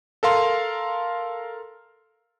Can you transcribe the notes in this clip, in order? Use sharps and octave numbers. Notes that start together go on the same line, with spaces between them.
A4 A#4 F5 C6